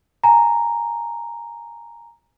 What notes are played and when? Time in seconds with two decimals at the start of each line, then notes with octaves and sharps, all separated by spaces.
0.24 G#5 A#5